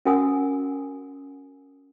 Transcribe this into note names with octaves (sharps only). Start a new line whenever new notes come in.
C#4 F#4 A#4 F#5 G#5 D#6